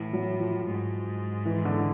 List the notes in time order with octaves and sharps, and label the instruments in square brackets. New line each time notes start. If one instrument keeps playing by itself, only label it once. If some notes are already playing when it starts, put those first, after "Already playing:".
Already playing: [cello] A2 [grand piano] E3
[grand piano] F#3
F3
[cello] G#2
[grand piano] E3
D3